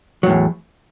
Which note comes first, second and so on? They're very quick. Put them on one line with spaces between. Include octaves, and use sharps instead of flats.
F#3 A2 E2